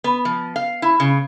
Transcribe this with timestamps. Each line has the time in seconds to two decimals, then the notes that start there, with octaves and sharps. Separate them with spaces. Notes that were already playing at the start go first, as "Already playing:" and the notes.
0.04 B3
0.25 F3
0.56 F5
0.82 E4
1.00 C#3